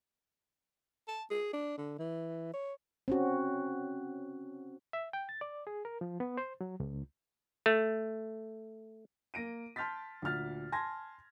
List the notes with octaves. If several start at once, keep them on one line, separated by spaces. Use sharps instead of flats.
A5
G#4
D4
D3
E3
C#5
C4 C#4 F#4
E5
G5
A6
D5
G#4
A#4
F3
B3
C5
F#3
C#2
A3
A#3 A#6 D7 D#7
A5 C6 F6 G6 A6 B6
D2 A#2 F6 A6
G#5 A5 C6 G#6 A#6